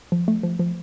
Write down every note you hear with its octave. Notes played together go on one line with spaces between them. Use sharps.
F3
A3
F3
F3